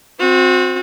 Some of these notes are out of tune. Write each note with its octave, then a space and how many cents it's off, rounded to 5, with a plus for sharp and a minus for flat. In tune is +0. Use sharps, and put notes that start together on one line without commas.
C4 +0 F#4 -30